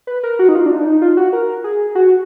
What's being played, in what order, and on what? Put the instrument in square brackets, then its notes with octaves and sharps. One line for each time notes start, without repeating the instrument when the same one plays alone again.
[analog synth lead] B4
A#4
F#4
D#4
F4
D4
D#4
D4
D#4
F4
F#4
A#4
G#4
F#4